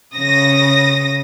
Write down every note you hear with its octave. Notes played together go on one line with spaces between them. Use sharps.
C#3 D#6 A#6